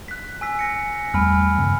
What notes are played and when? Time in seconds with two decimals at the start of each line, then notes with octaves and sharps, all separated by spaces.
0.08 F#6 B6
0.41 G#5 E6 B6
0.59 A#6 C#7
1.14 E2 G3 A3 G#5 B5 F6
1.58 G2 C#3 B3